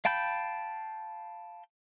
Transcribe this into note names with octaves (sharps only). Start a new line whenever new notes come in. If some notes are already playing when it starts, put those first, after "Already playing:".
F5 G5 A5 B5 G6